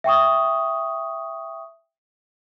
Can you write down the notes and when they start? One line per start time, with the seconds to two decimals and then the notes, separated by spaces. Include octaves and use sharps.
0.04 E5 G5 C#6 D#6